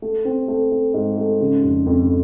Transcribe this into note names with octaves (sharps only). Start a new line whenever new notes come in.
A3
C4
A3
A3
G#2
A3
C#3
F1
F2